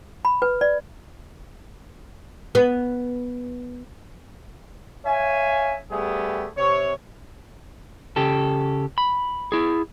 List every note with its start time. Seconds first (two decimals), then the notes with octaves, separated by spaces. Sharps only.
0.25 B5
0.42 B4
0.61 D5
2.55 B3
5.05 C#5 E5 F5 G#5
5.91 G3 A3 B3 G4 G#4
6.58 C3 C#5
8.16 C#3 G4 A4
8.98 B5
9.52 E4 G#4